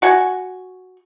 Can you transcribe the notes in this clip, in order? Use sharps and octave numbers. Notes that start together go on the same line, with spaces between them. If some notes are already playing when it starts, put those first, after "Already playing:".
F#4 F#5 G#5